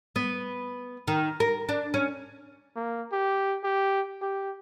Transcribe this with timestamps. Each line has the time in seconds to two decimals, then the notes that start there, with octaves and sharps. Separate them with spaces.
0.16 B3
1.08 D#3
1.40 A#4
1.69 D4
1.94 C#4
2.76 A#3
3.13 G4
3.64 G4
4.22 G4